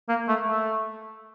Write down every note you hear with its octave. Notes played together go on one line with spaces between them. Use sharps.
A#3
A3
A3